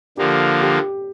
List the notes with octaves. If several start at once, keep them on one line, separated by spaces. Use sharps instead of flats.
D3 F3 A#3 G4
G4